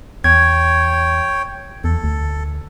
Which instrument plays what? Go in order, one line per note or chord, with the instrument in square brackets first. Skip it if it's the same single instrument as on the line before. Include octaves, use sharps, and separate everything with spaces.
[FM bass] E2 [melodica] C#5 G5 [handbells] G#6
[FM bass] E2 [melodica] A4
[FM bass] D2